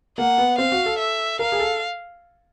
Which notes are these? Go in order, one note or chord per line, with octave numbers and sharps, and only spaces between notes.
A#3 F#5
B3
C4 F5
F#4
A4
E5
A#4 F5
G#4
A4